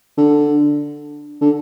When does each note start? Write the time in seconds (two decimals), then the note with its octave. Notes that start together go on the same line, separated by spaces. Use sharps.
0.17 D3
1.41 D3